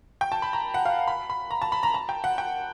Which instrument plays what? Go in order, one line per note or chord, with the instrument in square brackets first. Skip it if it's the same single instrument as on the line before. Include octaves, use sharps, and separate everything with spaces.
[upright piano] G5
A5
B5
A#5
F#5
F5
B5
B5
A#5
A5
B5
A#5
A5
G5
F#5
G5